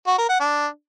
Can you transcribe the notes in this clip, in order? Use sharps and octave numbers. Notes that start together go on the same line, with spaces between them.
F#4
A#4
F#5
D4